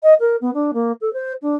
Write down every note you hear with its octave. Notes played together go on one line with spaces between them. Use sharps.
D#5
A#4
B3
D4
A#3
A4
C5
D4